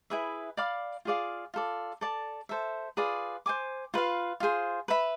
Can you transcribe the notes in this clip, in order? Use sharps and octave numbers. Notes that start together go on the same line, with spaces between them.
E4 G#4 B4 E5
D5 F5 B5 D6
F4 G#4 D5 F5
F4 A4 D5
A4 D5 A5
A4 C5 E5
F4 G#4 B4 D5
C5 G#5 D6
F4 B4 F5
F4 G#4 C5
B4 E5 B5